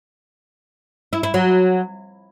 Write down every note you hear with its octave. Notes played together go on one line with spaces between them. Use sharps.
E4
E4
F#3